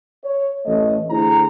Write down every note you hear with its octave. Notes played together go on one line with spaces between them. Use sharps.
C#5
A1 A3 D#5
D2 D3 E4 G#4 C5 A#5